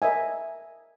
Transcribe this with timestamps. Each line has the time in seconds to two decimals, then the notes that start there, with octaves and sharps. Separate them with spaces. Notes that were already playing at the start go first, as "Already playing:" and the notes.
0.02 A#4 D#5 E5 G#5